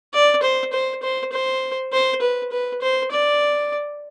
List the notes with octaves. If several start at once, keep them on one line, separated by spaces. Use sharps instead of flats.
D5
C5
C5
C5
C5
C5
B4
B4
C5
D5